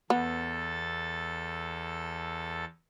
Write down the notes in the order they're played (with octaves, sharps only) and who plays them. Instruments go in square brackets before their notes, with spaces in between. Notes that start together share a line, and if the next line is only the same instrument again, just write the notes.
[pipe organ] E2 A4 A6 [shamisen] B3